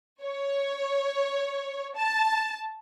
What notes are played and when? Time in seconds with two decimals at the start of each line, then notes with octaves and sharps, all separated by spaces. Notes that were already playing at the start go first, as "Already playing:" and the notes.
0.22 C#5
1.96 A5